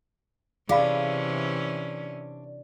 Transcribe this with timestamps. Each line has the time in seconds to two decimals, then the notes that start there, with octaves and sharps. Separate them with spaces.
0.69 C3 E3 C#4 D4 G#4 F5 B5